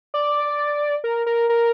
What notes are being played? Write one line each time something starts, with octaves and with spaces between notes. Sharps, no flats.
D5
A#4
A#4
A#4